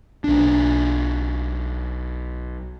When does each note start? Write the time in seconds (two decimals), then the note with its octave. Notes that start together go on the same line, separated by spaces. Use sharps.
0.24 B1 D4